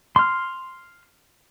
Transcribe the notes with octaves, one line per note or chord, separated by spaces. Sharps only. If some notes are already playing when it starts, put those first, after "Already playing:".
C6 F6